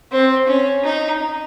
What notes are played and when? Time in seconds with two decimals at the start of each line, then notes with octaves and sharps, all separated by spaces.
0.12 C4
0.48 C#4
0.84 D#4